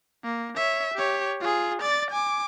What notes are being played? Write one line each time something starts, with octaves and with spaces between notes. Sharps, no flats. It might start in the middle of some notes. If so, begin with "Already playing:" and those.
A#3
C#5 E5
G4 C#5
F4 G#4
D5 A6
G#5 D6